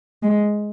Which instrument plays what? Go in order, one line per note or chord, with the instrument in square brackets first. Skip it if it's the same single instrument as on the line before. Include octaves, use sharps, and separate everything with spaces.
[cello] G#3